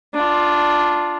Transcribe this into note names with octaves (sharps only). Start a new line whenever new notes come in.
D4 F4